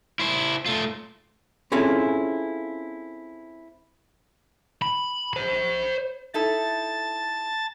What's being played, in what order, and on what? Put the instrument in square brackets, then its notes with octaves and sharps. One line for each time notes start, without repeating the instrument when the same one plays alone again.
[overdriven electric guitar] E4 C5
A3 F4
[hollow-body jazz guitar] C4 C#4 E4 F4 G#4 A4
[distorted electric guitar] B5
C5 B5
[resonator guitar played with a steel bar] D#4 E4 A4 [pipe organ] A5 A6